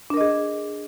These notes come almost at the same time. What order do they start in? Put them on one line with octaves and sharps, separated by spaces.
D4 A#4 D#5 G#4